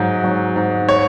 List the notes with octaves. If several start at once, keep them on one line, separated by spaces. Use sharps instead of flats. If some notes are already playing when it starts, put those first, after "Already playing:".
Already playing: G#2 F#3
F#3
G#2
C#5